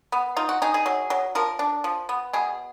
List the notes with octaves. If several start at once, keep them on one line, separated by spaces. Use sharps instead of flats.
B3
D#4 F4
F#4
D#4 G#4
G#4
F#3
F#3
F3 A#4
D4
F3
B3
B2 G#4